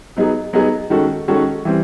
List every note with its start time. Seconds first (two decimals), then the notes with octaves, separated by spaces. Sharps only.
0.17 F#3 B3 D#4 G#4
0.53 F#3 B3 D#4 G#4
0.90 D#3 G#3 C#4 F#4 A4
1.28 D#3 G#3 C#4 F#4 A4
1.65 E3 G3 C4